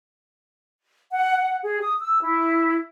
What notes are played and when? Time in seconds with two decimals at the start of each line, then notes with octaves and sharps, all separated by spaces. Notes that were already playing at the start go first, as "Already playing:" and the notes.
1.13 F#5
1.37 F#5
1.62 G#4
1.82 D#6
2.01 E6
2.21 E4